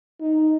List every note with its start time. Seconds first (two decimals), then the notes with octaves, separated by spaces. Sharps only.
0.21 D#4